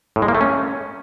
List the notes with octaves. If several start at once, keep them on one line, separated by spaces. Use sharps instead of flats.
A2
G#3
A#3
A3
C#4